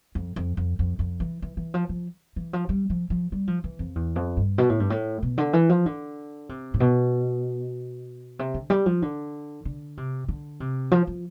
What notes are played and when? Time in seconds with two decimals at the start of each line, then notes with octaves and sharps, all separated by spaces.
0.15 F2
0.36 F2
0.57 F2
0.79 F2
0.99 F2
1.20 E3
1.42 E3
1.57 E3
1.74 F3
1.89 F3
2.36 E3
2.53 F3
2.69 G3
2.90 F3
3.10 F3
3.32 G3
3.47 F3
3.64 E3
3.79 F2
3.95 E2
4.16 F2
4.37 G2
4.58 B2
4.69 A2
4.80 G2
4.90 A2
5.22 B2
5.38 D3
5.53 E3
5.69 F3
5.86 D3
6.49 C3
6.74 A2
6.80 B2
8.39 C3
8.54 D3
8.70 G3
8.86 F3
9.02 D3
9.65 D3
9.97 C3
10.28 D3
10.60 C3
10.91 F3
11.07 F3